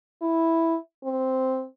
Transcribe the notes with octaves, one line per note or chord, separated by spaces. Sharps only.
E4
C4